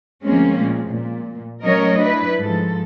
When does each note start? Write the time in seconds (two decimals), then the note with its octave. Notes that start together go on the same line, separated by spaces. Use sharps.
0.24 D2 F3 G#3 A#3 C4 C#4
0.57 A#2 F3 G#3
0.89 A#2
1.63 F#3 A3 C#4 A#4 C#5 D#5
1.97 D4 E4 B4
2.39 G#2 F3 A4